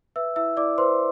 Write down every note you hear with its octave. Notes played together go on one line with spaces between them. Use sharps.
B4 E5 E6
E4 E5 E6
E4 D5 D6
B4 C5 C6